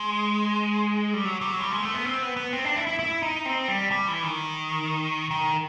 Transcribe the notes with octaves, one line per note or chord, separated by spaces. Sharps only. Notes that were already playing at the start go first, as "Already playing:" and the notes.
Already playing: G#3
G3
F#3
G3
F#3
G3
G#3
A3
B3
C4
B3
B3
C4
D4
E4
E4
E4
D#4
C4
G3
G3
E3
D#3
D#3